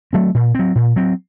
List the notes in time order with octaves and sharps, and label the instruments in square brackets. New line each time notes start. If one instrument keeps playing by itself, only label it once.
[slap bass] F#3 A3 C4
A#2
F#3 C4
A#2
F#3 C4